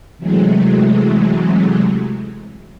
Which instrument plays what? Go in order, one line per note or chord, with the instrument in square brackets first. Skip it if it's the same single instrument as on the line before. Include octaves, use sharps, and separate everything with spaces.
[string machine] C3 E3 F#3 G#3 A3